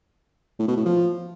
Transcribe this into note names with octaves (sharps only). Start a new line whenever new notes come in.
A2
B2
A2
F3